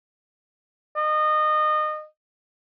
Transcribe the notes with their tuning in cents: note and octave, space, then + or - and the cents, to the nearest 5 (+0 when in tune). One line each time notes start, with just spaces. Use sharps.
D#5 -25